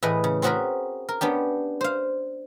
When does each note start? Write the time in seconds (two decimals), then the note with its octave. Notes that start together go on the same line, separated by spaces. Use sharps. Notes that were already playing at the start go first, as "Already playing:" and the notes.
0.03 A2 E3 G#4 B4 D#5
0.24 C#3
0.42 C4 C#4 F#4 G#4 A#4 B4
1.09 A#4
1.21 B3 C#4 D4 G4
1.81 C5 F5